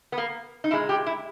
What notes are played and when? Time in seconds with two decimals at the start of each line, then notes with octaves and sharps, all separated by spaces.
0.12 B3
0.18 A#3
0.64 D#4
0.71 A#2 G#3 E4
0.89 G4
1.06 E4